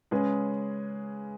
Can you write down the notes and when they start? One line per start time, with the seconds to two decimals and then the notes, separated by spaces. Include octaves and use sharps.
0.11 C#3 G#3 C#4 G#4 B4